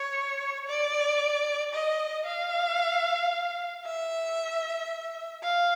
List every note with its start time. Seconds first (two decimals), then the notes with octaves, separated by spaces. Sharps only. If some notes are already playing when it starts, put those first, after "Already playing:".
Already playing: C#5
0.68 D5
1.73 D#5
2.26 F5
3.85 E5
5.43 F5